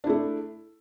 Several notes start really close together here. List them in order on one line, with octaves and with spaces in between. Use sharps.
D4 E4 A3